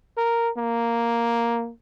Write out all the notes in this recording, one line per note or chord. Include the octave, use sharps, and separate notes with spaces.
A#4
A#3